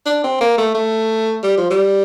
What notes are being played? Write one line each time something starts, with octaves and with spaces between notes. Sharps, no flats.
D4
C4
A#3
A3
A3
G3
F3
G3